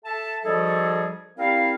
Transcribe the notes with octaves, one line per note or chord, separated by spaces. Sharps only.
A4 E5 A5
D#3 F3 G3 F#4 G#4 A4
G3 C4 E4 A#4 F5